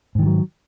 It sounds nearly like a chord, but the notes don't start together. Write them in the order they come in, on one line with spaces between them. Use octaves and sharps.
G#2 D#3 E3 F#3